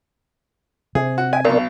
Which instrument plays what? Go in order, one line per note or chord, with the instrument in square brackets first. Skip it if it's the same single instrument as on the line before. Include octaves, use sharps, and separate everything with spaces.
[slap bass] C3 [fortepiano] G#4
[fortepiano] F#4
[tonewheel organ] D#5 E5 G5 [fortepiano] G#5
[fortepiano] B1 B2 [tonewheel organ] A#4 D5